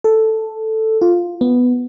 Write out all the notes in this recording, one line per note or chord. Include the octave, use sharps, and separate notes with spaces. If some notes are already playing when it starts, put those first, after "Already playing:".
A4
F4
B3